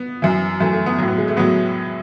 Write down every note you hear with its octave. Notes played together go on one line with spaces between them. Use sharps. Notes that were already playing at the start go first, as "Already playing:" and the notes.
Already playing: B3
F#2 E3
F#2 E3 A3
A3
B3
A2 F#3
B3
G#3
A3
A2 F#3 B3